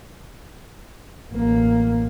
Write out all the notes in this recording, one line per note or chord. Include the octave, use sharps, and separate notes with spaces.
A1 A#3